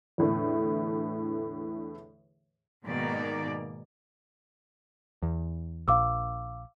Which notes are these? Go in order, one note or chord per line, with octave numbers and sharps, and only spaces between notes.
E2 A2 D3 A3
G#2 B2 D#3 A#3 D5
E2
A#1 F5 D6 E6